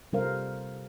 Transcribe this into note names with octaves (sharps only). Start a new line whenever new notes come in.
C3 G3 A4 A#4 C5 F5